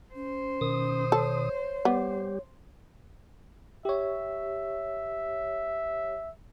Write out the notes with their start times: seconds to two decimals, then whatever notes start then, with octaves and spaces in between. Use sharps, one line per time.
0.15 C#4 C5
0.61 B2 D#3 D#6
1.12 A4 C#5
1.85 G3 B3 G4
3.85 G4 C#5 E5